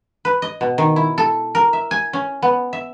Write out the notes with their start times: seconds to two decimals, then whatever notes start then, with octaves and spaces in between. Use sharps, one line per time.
0.25 B4
0.42 D#5
0.61 B2
0.78 D#3
0.96 E4
1.18 A4
1.55 A#4
1.73 E5
1.91 G#5
2.13 C#4
2.42 B3
2.73 E5